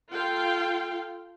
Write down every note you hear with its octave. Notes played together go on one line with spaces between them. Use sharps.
F4 A4 F5 G5